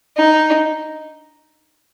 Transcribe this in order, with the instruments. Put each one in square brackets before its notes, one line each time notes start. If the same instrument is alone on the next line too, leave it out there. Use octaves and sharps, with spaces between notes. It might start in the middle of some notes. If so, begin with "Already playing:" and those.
[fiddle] D#4